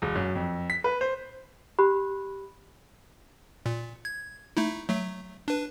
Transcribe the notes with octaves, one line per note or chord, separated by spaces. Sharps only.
E1
F#2
F2
B6
B4
C5
G4 B5 F#6
A#2
G#6
A3 D#4 E4
F#3 A3
D4 B4